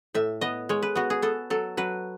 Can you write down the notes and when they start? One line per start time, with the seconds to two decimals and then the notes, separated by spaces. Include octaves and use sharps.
0.14 A2 E5
0.41 B3 D#5
0.69 G#3 C#5
0.82 B4
0.95 B3 F#4
1.10 G#4
1.22 B3 A4
1.50 F#3 A4
1.77 F#3 B4